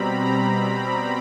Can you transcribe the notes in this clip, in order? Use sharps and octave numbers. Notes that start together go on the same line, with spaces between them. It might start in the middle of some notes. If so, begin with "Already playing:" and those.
Already playing: B2 G3 C4 A#5 B5
A#5